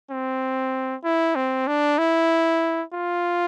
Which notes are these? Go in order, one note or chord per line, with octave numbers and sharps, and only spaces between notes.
C4
E4
C4
D4
E4
F4